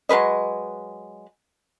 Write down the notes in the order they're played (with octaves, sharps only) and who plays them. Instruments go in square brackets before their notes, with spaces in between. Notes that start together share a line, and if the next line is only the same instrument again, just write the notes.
[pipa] F#3 G#3 B4 D#5